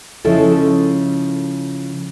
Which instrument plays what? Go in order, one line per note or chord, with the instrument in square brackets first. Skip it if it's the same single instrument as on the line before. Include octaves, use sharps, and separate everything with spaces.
[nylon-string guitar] C#3 F3 G#3 E4 A4